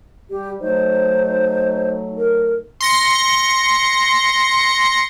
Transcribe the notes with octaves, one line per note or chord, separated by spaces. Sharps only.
G3 G4
F#3 A3 D#4 C5
A#4
C6 A#6 C#7